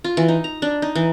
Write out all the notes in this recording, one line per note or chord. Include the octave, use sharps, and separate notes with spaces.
F4
E3
D#4
A#5
D4
D#4
E3